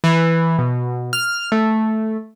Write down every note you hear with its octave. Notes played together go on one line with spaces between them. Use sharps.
E3
B2
F6
A3